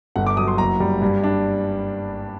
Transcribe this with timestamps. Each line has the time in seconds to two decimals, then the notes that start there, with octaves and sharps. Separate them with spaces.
0.16 G1 F#5
0.27 D6
0.37 F#3 D#6
0.48 C6
0.58 F#1 A#5
0.80 G3
1.02 G2
1.23 D4